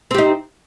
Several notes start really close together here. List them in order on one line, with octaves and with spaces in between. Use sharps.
C4 G4 D#4